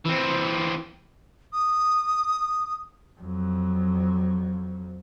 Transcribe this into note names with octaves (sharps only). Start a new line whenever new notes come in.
E3 C4
D#6
F2 F#3